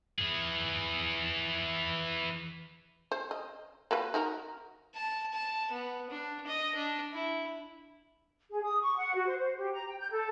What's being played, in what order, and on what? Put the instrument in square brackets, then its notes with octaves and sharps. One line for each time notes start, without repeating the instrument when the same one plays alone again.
[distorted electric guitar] E3 G#4
[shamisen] C5
D#5
A#3 F#4 B4
D#4 F#4 A#4
[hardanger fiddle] A5
A5
B3
D4
D#5
D4
E4
[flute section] G#4
D#6
C#6
F#5
F#4
C5
C5
G4
A#5
G5
G6
A4